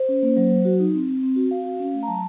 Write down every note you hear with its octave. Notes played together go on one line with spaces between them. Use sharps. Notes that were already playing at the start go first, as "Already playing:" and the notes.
Already playing: C5
C#4
A#3
F#3
F#3
F#4
D#4
C4
C4
C4
F#4
C4 F5
F#4
C#4
A3
A#5
F#3 A5